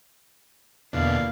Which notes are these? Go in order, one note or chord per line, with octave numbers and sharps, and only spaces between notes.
E2 B2 D3 A#3 F5